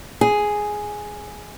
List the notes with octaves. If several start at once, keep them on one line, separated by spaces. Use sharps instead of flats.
G#4